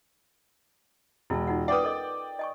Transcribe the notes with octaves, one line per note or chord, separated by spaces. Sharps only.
E1 E4 A5
D#4 F4 F#5
B4 D5 F#5 G5 D#6
A4 A#4 D#5
D#5 G#5 C#6